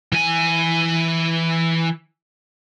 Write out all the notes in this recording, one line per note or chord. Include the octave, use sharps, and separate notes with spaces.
E3 G#5